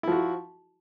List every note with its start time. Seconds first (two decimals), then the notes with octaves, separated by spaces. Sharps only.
0.03 E4
0.08 F3
0.12 F#4